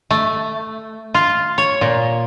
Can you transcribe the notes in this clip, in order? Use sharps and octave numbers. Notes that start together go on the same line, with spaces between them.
A3
F4
C#5
A#2